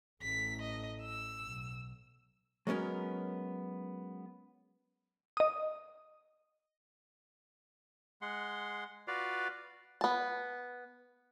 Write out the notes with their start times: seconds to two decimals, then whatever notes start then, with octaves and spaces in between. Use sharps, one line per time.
0.22 A1 A3 B6
0.62 D#5
1.02 E6
1.42 B1
2.67 F#3 G#3 B3 C#4 A#4
5.37 D#5 D#6
8.22 G#3 F#5 C6
9.08 F4 F#4 B4 D5 F5
10.01 B3 A5